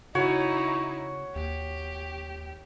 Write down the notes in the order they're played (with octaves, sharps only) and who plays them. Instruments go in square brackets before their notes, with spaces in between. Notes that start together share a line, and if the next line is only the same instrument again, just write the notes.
[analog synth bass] C#3 [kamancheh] D#4 E4 [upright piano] F#4 [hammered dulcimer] C#5
[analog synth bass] D#2 [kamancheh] G4